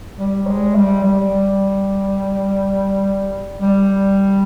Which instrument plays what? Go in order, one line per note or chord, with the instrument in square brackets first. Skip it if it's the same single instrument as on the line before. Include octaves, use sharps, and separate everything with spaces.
[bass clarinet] G3
G#3
G3
G3
G3